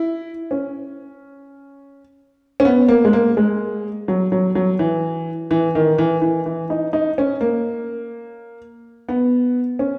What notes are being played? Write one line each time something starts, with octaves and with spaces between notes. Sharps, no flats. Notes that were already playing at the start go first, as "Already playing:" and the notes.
Already playing: E4
C#4
C#4
B3
A#3
G#3
A#3
G#3
F#3
F#3
F#3
E3
E3
D#3
E3
E3
E3
D#4
D#4
C#4
A#3
B3
C#4